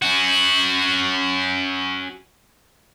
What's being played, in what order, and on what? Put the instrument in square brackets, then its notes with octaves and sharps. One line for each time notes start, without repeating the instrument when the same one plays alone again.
[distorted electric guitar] C#4 F#4